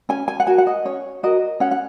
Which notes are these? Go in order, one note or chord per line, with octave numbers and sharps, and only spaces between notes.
C#4 G#5
G#5
F#5
F#4 A#4 G#5
F#5
D#5
C#4 C#5
F#4 A#4 D#5
C#4 F#5
F#5